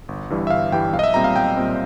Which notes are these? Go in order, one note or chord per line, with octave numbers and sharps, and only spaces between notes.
G1
G2 E3 G3
E5
G1 F5
G2 E3 G3 G5
B1 F5
D#5
E5
A#2 G3 C4 A#5
F5
B1 G5
A#2 G3 C4